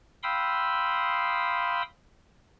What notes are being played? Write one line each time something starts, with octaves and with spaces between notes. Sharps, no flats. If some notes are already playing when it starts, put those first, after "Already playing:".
F5 G5 B5 C6 D#6 E6